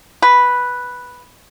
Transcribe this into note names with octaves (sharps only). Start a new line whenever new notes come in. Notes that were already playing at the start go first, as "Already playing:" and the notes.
B4